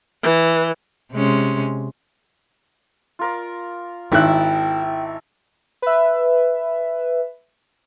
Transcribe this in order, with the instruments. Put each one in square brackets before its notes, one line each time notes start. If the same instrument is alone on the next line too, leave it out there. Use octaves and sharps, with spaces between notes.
[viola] E3
[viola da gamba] C3 G#3 C#4
[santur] F4 A#4 D5
[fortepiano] G#1 D#3 F#6 [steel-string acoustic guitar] E4 [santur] E5 A5 [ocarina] G5
[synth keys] B4 E5